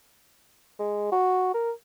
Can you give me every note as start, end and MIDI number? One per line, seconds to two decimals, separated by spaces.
0.80 1.10 56
1.12 1.52 66
1.54 1.71 70